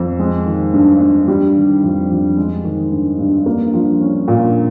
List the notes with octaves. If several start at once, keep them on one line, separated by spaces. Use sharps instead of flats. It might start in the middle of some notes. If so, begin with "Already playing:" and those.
Already playing: F2
G#3
D#3
G2
G2
G3
D#3
F2
F2
G#3
D#3
G2
G2
A#3
F3
C#4
A#2